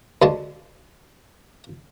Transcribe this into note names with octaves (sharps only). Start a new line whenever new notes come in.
D2 G#3 A5